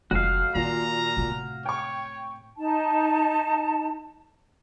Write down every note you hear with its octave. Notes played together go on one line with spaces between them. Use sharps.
F1 F2 F#4 F5
A#2 D#3 A#5
A2 C3
C#5 G5 C#6
D#4 A5